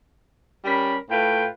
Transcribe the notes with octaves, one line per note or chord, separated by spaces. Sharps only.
G3 C#4 A#4 B5
A2 A3 F4 B4 G5